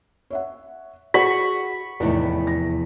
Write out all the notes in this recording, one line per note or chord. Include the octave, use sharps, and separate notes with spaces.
C#5 E5 F#5
F#4 G#4 C5 B5 C#6
F1 E2 A2 B3 D#4 E4 D5
A#6